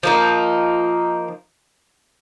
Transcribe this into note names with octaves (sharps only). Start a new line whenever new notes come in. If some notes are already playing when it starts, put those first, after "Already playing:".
F3 A#3 D#4